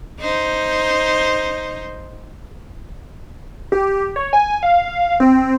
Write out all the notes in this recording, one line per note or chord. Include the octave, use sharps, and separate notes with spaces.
D#4 C5
G4
C#5
G#5
F5
C4